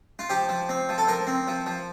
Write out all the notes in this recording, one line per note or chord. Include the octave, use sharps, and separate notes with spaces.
F4
F3 G4
F3
C4
F3
A4
F3 A#4
C4
F3
F3